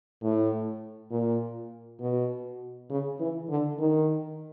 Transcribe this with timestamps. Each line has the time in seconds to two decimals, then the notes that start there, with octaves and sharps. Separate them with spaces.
0.23 A2
1.11 A#2
2.00 B2
2.90 C#3
3.20 E3
3.49 D3
3.79 D#3